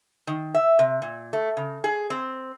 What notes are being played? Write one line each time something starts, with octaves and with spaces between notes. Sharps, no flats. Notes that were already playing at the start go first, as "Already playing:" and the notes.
D#3
E5
C3
A#2
A3
C#3
G#4
C4